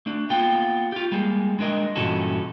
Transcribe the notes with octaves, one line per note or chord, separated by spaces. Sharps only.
A3 D4
A#3 B3 F4 G5
F4 G4
G3 G#3 A#3
G#3 D4 A#4 D#5
G2 A#2 E3 C#4 F#4 A4